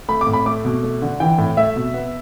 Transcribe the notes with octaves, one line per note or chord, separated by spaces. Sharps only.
A3 B5
D6
A2
B5
A3 D6
B2
A3
D3
E3 G5
A2
A3 E5
B2
B3